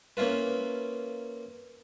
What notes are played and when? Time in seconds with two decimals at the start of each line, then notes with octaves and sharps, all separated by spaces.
0.17 A#3 C#4 E4 F4 B4